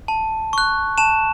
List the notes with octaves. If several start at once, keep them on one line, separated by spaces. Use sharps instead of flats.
A5
C#6 F#6
A5 E7